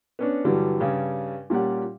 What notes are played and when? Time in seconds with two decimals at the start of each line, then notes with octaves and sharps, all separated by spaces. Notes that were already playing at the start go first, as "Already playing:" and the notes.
0.19 B3 C#4 D4
0.45 G2 D3 E3 F#3 G3
0.80 G2 C#3 G3
1.50 A#2 G3 C#4 G4 F#5